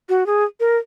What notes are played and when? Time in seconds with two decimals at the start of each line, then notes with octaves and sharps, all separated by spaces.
0.09 F#4
0.26 G#4
0.60 A#4